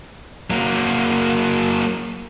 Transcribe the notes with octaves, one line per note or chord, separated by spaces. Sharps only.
F#3 A#3